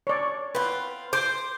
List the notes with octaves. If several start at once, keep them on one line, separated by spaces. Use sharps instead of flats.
C#5 D5
C4 F4 B4
C5 D6